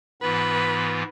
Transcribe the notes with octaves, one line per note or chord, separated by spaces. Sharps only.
G#2 E3 B3 F4 B4